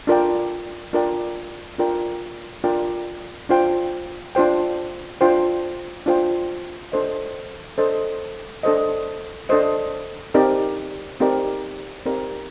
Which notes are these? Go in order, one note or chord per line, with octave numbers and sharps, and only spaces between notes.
D4 F4 A#4 D5 G5
D4 F4 A#4 D5 G5
D4 F4 A#4 D5 G5
D4 F4 A#4 D5 G5
D4 F4 C5 G5
D4 F4 C5 G5
D4 F4 C5 G5
D4 F4 C5 G5
D4 A4 C5 D#5
D4 A4 C5 D#5
D4 A4 C5 D#5
D4 A4 C5 D#5
C4 D#4 G4 A#4 D5
C4 D#4 G4 A#4 D5
C4 D#4 G4 A#4 D5